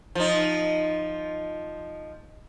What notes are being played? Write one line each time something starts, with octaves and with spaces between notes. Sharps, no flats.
F3 D#4